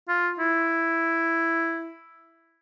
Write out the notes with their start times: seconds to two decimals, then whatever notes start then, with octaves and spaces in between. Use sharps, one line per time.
0.08 F4
0.39 E4